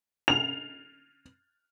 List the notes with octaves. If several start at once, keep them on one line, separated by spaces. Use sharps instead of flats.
F7